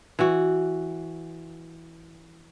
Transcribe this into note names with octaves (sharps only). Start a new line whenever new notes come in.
E3 F#4